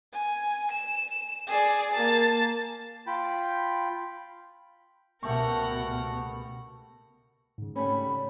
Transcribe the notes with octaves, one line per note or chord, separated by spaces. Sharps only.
G#5
E7
G#4 D5
A#3 A5
F4 G5 B5
C#2 B2 A3 G4 A#4 F#5 C#6
B3
G#2 C#3
G3 A3 C#4 B5